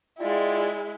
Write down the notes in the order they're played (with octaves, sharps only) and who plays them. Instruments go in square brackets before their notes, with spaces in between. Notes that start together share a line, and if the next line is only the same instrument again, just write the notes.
[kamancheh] G#3 E4 [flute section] F4 D5 G5